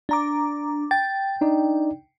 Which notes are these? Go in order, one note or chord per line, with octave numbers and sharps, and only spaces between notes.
D4 A#5 D6
G5 A6
D4 D#4 D5